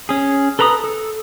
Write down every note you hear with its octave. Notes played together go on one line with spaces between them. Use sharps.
C#4 G#4
A4 B4 A#5 B5 D#6
A4